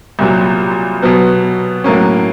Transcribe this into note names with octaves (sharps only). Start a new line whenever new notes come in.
C2 A#2 F#3
B2 F#3 B3
A2 F#3 A#3 C#4